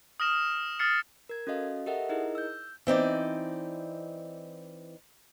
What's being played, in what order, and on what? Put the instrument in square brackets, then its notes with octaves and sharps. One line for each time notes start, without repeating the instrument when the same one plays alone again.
[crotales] D#6 F6 A#6 E7
D#6 F6 A6 C7 C#7
[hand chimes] A#4 G#6
C#4 F#4 A4 D#5 F5
G4 A4 A#4 D#5 E5 F#5
D#4 E4 G#4 A#4 D#5
E6 G6
[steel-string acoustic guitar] E3 C4 D#4 D5